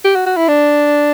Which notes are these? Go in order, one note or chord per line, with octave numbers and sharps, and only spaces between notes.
G4
F#4
F#4
E4
D4